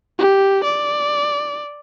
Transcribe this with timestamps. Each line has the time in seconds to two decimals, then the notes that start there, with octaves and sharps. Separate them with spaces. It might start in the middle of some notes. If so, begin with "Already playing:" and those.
0.19 G4
0.64 D5